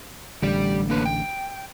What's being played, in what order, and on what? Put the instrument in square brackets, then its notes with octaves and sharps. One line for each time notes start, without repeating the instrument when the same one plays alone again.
[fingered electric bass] A1 D3 [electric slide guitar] G3 G4 D5
[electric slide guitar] A#3 D4 B4
G5